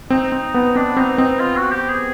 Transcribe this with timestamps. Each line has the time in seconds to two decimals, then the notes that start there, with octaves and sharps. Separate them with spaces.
0.10 C4 D#4
0.32 C4
0.54 B3
0.76 C4 D4
0.97 C4 D#4
1.18 C4 D#4
1.40 F4
1.57 F#4
1.72 G4
1.89 G#4